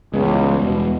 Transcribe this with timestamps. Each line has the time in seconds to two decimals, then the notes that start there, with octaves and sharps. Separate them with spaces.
0.14 C#2 E3 G3 G#3 B3
0.64 E2 B2